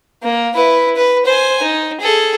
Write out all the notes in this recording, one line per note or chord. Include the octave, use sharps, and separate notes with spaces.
A#3
E4 B4
B4
C5 G#5
D#4
G#4 A4